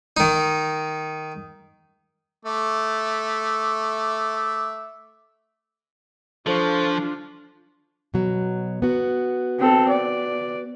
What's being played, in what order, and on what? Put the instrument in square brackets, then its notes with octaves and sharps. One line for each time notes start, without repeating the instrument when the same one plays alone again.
[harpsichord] D#3 D#4
[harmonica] A3 E5 D6
[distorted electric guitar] F3 [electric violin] D4 F4 [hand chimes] A4 C5 C#6
[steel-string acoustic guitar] B2 F#3
B3 F#4
[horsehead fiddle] C4 A4
D5